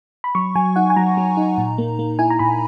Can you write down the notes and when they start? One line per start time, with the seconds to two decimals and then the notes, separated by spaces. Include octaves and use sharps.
0.24 B5
0.35 F#3 C#6
0.55 F#3 G#5
0.76 D#4 F#5
0.90 G#5
0.96 F#3 A#5
1.17 F#3
1.37 D#4
1.58 A#2
1.78 A#3
1.99 A#3
2.19 E4 G#5
2.30 A#5
2.39 A#2 B5